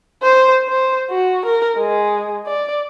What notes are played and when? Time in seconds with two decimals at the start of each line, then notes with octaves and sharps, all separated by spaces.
0.22 C5
0.69 C5
1.11 F#4
1.46 A#4
1.78 G#3
2.47 D5